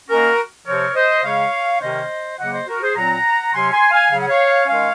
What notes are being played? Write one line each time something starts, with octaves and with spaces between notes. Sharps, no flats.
D#3 A#3 C#4 F#4 A#4
C3 F3 C4 A#4 C#5
C5 D#5
C#3 G#3 C#4 C#5 F5
C3 D#3 A#3 C#4 C5 D#5
C#3 F#3 A#3 D#5 F#5
C5 D#5
F#4 A#4
G#4 C5
A#2 F#3 C4 F#5 A#5
C3 F#3 C#4 G#5 C6
G#5 C6
F5 G#5
C#3 F#3 C#4 F5
F#5
C#5 F5
D#3 G#3 C#4 C#5 F5